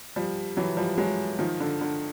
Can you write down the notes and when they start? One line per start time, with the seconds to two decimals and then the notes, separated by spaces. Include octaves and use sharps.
0.16 F3 G3
0.57 E3 F#3
0.77 F3 G3
0.98 F#3 G#3
1.39 D#3 F3
1.60 D3
1.81 D3